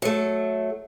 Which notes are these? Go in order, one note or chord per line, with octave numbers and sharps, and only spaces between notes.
F#3 A3